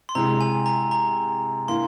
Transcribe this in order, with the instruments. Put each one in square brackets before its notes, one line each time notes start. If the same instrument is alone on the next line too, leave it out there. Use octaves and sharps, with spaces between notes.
[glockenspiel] C6
[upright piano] C3 E3 G#3 [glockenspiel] A#5
[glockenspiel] G#5
A#5
A#5
[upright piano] E3 A#3 E4 [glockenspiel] C6